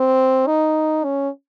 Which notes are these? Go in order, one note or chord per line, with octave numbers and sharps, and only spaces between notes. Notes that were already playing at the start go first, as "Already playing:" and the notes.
Already playing: C4
D#4
C#4